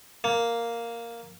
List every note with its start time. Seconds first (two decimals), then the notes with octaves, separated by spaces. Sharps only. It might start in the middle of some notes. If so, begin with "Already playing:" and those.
0.24 A#3